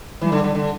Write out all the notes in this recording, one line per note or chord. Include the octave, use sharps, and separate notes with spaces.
E3 G3
D3
D3
D3